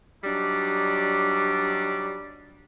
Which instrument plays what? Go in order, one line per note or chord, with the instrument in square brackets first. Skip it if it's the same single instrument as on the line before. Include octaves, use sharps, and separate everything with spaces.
[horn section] F#3 G3 D4 D#4